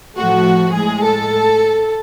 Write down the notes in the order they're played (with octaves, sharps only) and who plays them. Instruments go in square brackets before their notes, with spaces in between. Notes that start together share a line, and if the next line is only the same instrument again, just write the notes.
[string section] A2 F3 A3 F#4
A2 G#3 G#4
A4